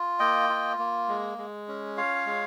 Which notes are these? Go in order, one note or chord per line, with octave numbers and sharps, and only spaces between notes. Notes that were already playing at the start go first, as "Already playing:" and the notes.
Already playing: F4
A#3 D#5 G5
F4
A#3
G#3
G#3
C#4
F4 C#5 F5
G#3